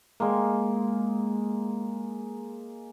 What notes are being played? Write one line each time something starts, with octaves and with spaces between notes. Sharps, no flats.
G#3 A#3